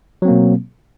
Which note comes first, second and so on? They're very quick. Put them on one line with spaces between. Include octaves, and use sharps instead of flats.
F#3 C4 A#3 B2